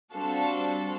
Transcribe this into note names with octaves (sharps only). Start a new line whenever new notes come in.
G3 C4 D4 F#4 A4 F5